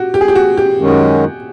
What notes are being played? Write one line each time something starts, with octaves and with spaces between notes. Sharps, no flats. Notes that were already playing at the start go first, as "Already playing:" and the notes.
Already playing: F#4 G4
G4
G#4
G4
F#4
G4
F#2 D#3 G#3 C#4 F#4